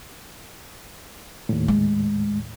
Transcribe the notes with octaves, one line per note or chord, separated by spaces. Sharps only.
D#2 A2
G#3